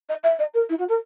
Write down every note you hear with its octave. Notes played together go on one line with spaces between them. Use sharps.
D#5
E5
D#5
A#4
E4
F#4
A#4